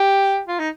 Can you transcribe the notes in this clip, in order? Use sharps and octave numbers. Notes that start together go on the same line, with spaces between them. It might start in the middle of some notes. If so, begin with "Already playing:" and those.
Already playing: G4
F4
D#4